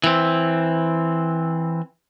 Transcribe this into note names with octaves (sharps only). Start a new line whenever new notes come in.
E3 C4